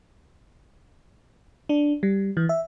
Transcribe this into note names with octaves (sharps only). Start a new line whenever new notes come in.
D4
G3
E3
E5